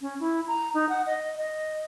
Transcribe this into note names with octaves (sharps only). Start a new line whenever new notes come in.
C#4
E4
A#5
D#4
F#5
D#5
D#5